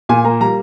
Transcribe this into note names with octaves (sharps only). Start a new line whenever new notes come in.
A#2 G#5
A#3 A#5
G3 A#5